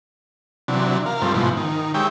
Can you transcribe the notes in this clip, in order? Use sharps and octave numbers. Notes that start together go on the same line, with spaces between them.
C3 E3 F#3 D4
A#4 F5
G2 F3 A3 C4
G#2 B2 E3 F3
D#3
G#3 G4 C#5 E5 G5